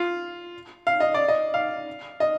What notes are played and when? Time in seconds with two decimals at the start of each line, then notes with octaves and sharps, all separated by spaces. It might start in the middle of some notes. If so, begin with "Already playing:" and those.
Already playing: F4
0.87 F5
1.00 D#5
1.14 D5
1.28 D#5
1.54 F5
2.20 D#5